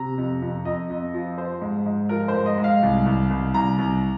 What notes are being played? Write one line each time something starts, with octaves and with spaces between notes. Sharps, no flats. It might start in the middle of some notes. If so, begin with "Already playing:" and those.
Already playing: C3 A#5
F2
F2
F2 D#5
F2
F3
F3 C5
G#2
G#2
F3 A#4
C5
G#2
D#5
G#2
F5
C2
C2
C2
C2 A#5
C2